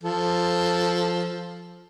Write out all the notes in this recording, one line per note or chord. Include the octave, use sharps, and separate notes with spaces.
F3 A4